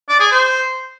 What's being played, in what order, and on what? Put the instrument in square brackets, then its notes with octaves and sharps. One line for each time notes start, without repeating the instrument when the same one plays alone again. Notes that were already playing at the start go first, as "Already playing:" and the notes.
[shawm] D5
G#4
C5